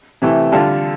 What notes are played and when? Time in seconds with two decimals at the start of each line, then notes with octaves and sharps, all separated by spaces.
0.22 C3 E3 A3 E4
0.52 D3 G3 D4 F4 A4